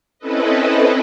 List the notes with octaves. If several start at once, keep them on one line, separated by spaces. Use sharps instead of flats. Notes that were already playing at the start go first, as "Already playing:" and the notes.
C4 C#4 E4 A4 B4 D#5